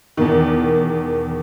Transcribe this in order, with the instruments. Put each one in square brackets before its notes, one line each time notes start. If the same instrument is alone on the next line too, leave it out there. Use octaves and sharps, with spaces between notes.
[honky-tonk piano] E2 B2 D#3